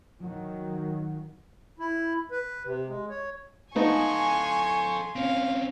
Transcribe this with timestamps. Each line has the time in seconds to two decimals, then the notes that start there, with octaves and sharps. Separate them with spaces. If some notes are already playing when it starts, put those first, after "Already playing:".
0.21 D#3 F#3
1.79 E4
2.31 B4
2.65 C3
2.88 G#3
3.10 C#5
3.76 A3 B3 D#4 A4 F5 G#5 C6 C#6
5.16 C4 C#4 F5